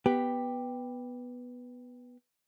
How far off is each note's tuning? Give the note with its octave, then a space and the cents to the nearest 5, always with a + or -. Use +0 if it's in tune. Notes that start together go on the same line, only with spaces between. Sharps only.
B3 +0 G4 +5